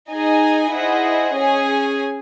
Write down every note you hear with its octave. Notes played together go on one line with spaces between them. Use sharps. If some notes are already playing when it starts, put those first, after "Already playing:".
D#4 G#4 D#5 G#5
E4 G#4 C5 D#5 F#5
C#4 G#4 C#5 G#5